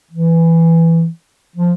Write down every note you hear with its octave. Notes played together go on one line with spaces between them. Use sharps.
E3
F3